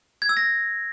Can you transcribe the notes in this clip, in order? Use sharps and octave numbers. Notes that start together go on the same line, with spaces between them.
G#6
E6
A#6